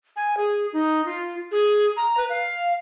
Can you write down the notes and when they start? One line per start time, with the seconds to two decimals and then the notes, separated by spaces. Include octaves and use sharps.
0.16 G#5
0.37 G#4
0.73 D#4
1.06 F4
1.51 G#4
1.97 A#5
2.17 B4
2.30 F5